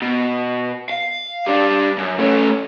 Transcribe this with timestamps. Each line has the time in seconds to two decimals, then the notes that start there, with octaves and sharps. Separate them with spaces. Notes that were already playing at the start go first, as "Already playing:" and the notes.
0.02 B2
0.90 F5
1.47 G3 D4
1.98 F#2
2.19 A3 C#4